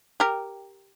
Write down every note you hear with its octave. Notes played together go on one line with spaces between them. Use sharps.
G4 A#4